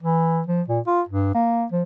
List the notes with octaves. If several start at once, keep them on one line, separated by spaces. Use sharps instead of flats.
E3
F3
A#2
F4
G2
A#3
F3